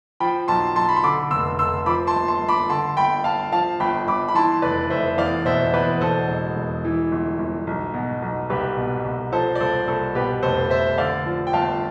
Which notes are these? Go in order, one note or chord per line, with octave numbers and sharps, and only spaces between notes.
F3 G5 B5
B1 A5 C6
B1 A5 C6
B5
C6
D3 B5 D6
F1 C6 E6
F1 C6 E6
F3 B5 D6
A5 C6
G1
A5 C6
G1
B5 D6
D3 A5 C6
G1 G5 B5
G1 F5 A5
F3 F5 A5
G1 G5 B5
G1 B5 D6
B5
E3 A5 C6
F1 B4 D5
F1 C5 E5
E2 D5 F5
B2 C5 E5
E2 B4 D5
B2 A4 C5
E1
E1
E3
G1
G1
B1
B2
B1
C2 G4 B4
B2
C2
F3 A4 C5
D5
C2 A4 C5
C2 A4
B2 G4 B4
F1 A4 C5
F1 C5 E5
D3 D5 F5
F3
G5
G1 F5 A5